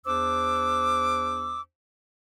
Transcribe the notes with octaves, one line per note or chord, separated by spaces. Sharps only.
E2 D4 C5 D6 E6